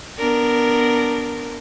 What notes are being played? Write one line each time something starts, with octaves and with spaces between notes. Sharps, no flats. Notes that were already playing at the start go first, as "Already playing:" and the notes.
B3 D4 A#4